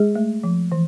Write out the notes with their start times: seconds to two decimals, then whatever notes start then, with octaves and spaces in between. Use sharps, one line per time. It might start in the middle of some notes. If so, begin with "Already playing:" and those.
Already playing: G#3 G#4
0.15 A3
0.44 F3
0.72 E3